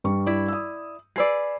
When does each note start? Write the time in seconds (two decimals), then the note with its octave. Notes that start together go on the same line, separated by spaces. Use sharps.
0.04 G2 G3 C#6
0.26 E4 D5
0.48 D#6 E6
1.16 G#4 B4 D5 E6 C7